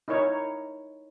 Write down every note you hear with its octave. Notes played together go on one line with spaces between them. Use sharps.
D#4 E4 A#4 C#5